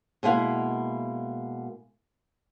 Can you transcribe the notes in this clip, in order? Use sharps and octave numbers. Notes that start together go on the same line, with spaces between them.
B2 G#3 A#3 E4 F5 F#5